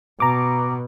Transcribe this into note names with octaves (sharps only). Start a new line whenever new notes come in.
B2 A#5 D6